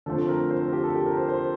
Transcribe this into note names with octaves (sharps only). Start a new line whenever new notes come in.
D3 F3 A3 C4 A4
A#4
C5
A#4
G4
A4
G4
A#4
C5
C5
A#4